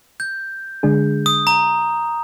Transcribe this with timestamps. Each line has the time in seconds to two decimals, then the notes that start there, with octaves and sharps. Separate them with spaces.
0.20 G6
0.83 D3 G#3 D4 G#4
1.26 D#6
1.47 A#5